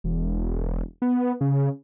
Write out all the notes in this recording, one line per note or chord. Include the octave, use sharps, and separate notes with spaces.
E1
B3
C#3